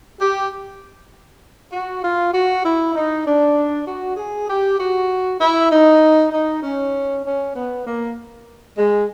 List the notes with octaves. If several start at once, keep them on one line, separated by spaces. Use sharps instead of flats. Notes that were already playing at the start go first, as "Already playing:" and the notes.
G4
F#4
F4
F#4
E4
D#4
D4
F#4
G#4
G4
F#4
E4
D#4
D#4
C#4
C#4
B3
A#3
G#3